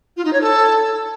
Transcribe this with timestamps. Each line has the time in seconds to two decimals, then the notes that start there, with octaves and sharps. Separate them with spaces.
0.16 F4
0.24 D#4
0.32 C#5
0.40 A4